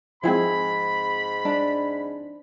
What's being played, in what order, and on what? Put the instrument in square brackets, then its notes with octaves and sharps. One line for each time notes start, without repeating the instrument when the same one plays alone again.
[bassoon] G#2 [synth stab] F3 G#3 C4 [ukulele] E4 G#4 [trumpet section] B5
[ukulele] D4